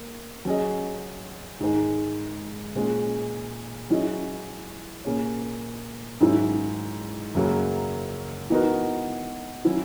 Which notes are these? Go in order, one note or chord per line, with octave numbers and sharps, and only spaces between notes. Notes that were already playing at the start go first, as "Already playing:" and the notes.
Already playing: A#3
F#3 C#4 G#4 D#5
G#2 D#3 G#3
A#2 G#3 C#4 G#4
F#3 C#4 E4 G#4 D#5
A#2 A#3 C#4 G#4 C#5
G#2 D#3 F#3 C#4 E4
F#2 C#3 F#3 A#3
E3 B3 D#4 F#4 A#4
D#3 F#3 C#4 E4